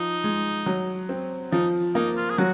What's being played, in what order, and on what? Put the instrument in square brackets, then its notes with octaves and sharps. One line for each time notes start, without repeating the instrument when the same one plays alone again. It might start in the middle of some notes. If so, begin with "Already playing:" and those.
Already playing: [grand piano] F3 [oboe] D#4
[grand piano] G#3
F#3
C4
[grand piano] F3 [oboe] D#4
[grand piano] A#3 [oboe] D#4
[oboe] F4
G#4
[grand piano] F#3 [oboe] F#4